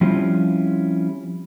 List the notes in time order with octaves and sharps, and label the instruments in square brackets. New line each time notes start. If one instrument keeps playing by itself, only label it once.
[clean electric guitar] F3 G3 C4 C#4 E4 F4